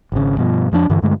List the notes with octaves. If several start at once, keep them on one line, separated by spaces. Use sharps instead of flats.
G#1 C#3
G2 B2 F3
F2 F3 A3 D4
G2 D3 E3
G2 D3 G#3 A3